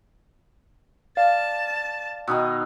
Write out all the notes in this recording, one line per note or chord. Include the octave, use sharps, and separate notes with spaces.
D5 F5 A5
B2 D#3 D#4 B5 D#6 E6